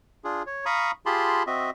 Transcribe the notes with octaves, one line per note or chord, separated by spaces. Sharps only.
D4 F4 G#4
C#5
F5 A#5 B5 C#6 D#6
F4 G4 G#4 A5 B5 C6
C4 F#4 D#5 E5